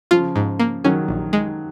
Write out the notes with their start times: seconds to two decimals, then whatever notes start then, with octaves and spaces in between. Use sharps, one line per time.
0.11 C#3 F3 F4
0.36 G#2
0.59 A#3
0.84 D#3 F#3 C#4
1.08 A#1
1.33 G#3